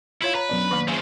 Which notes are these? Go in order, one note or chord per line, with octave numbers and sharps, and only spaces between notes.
E4 F4 C#5 F5
B4 C#5 A#5
F#2 B2 D4
D#3 F#3 A#3
C#3 F3 G#4 E5 A5